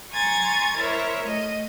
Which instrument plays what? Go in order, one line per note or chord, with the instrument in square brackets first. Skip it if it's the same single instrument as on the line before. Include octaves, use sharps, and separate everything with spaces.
[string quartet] G#5 A#5 C6 C#6 G#6 A6
E4 A#4 C5 C#5 E5
A3 D#5